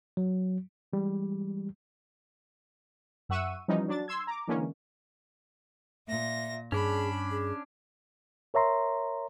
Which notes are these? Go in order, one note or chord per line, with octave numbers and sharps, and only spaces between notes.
F#3
E3 G3 G#3
F#2 E5 F#5 C#6 E6 D#7
E3 F3 G3 C#4 D#4
F#3 D4 A6
C6 E6 G#6
A#5 D6
D3 E3 G#3 A#3 C#4
A#2 E5 A#6
G2 C#4 D4 G#4 B5
G#4
A#4 C#5 E5 A#5 C6